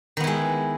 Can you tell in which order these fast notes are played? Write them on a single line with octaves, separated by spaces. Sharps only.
D#3 B3 E4 G#3